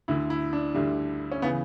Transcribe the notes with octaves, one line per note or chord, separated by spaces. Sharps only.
D2 D3 E4
E4
D4
D2 D3 G3
C#4
C#3 E3 B3